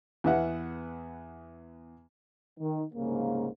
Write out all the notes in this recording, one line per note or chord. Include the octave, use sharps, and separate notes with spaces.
E2 B3 B4 E5 F#5
D#3
C2 G#2 C#3 A#3